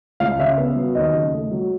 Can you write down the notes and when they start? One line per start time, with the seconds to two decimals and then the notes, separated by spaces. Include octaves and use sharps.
0.20 C#2 F5
0.39 C#3 E5
0.58 B3
0.76 F#3
0.95 D#2 D#5
1.14 C#3
1.33 A3
1.51 F#3